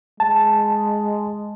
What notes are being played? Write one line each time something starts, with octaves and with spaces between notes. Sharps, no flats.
G#3 A5